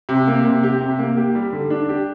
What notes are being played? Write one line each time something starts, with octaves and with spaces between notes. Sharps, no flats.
C3
A#3
C3
G4
C3
A#3
G4
G3
D3
D4
G4